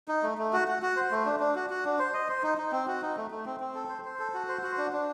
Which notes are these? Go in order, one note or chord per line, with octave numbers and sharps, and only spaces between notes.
D#4
A3
A3
F#4
F#4
F#4
C5
A3
D4
D4
F#4
F#4
D4
C5
D#5
C5
D#4
D#4
C4
F#4
D#4
A3
A3
C4
C4
A4
C5
C5
A4
F#4
C5
F#4
D4
D4